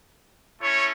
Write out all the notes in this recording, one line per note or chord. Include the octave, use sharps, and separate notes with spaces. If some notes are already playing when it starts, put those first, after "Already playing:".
A3 C#4 E4 C#5